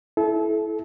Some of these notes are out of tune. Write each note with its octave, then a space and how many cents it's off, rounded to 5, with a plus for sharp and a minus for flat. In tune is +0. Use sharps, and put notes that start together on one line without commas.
E4 +0 A4 -30